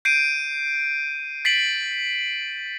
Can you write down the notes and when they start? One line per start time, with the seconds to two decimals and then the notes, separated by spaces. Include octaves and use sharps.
0.05 G6 C7 D7 D#7
1.45 A6 B6 C7 D7 F#7